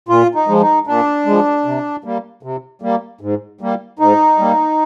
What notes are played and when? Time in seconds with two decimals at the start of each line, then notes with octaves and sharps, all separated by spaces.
0.09 A#2 F4
0.35 D#4
0.48 F3 G#3
0.61 D#4
0.87 A#2 D4
1.26 F3 G#3
1.65 C3
2.04 G3 A#3
2.43 C3
2.82 G3 A#3
3.21 G#2
3.61 G3 A#3
3.99 G#2 D#4
4.38 G3 A#3